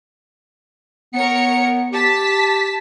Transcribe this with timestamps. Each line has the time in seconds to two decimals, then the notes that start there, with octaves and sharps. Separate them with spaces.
1.14 B3 A#4 C#5 C#7
1.93 G4 A5 B6